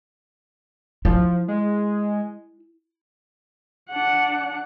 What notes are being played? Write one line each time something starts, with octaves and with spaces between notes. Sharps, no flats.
F3 E4
G#3
D4 F#5